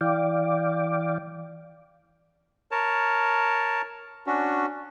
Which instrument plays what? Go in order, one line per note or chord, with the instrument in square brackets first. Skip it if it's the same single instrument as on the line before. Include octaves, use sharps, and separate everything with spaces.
[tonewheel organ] E3 D5 F5 G5 D6
[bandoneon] A#4 C#5 A5
C#4 D4 F#4